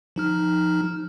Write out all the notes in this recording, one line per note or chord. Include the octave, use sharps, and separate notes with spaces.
F3 D#4 F6